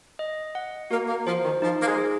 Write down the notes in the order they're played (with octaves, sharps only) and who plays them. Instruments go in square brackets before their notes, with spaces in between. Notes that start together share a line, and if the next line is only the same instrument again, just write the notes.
[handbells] D#5
F#5
[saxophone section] A#3 [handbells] F#4
[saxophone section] A#3
[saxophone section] F3 [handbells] C5
[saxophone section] D#3
[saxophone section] F3 [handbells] D#4
[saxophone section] A#3
G#3
[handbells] G#4